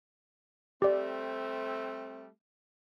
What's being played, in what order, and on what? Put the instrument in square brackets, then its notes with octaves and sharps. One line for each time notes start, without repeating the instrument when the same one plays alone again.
[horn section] G3 A3 C4 [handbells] G4 D5